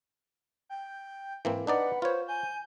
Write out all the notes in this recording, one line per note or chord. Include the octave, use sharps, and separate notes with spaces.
G5
G#2 E3 A#3 C4
D4 D#4 B4 D5 F#5
F4 C5 C#5
G#5 G6